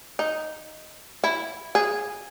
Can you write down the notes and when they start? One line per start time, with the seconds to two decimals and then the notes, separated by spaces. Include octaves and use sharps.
0.19 D#4
1.24 E4
1.75 G#4